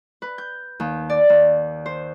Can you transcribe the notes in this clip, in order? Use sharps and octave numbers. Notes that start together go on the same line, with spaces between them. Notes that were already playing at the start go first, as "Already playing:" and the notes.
B4
G6
D#2
D5
D#2
C5